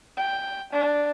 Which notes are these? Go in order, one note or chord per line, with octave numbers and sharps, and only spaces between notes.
G5
D4